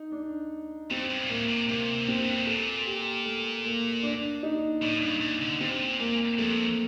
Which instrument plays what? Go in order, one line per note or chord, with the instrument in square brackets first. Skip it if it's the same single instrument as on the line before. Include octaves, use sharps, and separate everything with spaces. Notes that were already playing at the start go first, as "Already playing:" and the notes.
Already playing: [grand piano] D#4
D4
[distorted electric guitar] F2 [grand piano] C4
[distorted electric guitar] G2
A#2
[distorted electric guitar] A2 [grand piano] A#3
[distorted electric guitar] C3
[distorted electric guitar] C3 [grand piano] A#3
[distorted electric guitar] F2 [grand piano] C4
[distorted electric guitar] G2
A2
[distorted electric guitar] A#2 [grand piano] A4
[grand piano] G4
A3
A#3
D4
D#4
[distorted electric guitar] A2 [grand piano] D4
[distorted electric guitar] G2
A#2
D3
[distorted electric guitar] A#2 [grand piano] C4
[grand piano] A#3
[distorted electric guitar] F2 [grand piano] A3